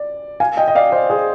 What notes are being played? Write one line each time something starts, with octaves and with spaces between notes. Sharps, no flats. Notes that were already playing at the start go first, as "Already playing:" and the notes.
Already playing: D5
F5 G#5
D#5 G5
D#5
D5 F5
C5 D#5
G#4 C5